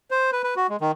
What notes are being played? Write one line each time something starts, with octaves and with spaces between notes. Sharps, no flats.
C5
B4
B4
F#4
G#3
D#3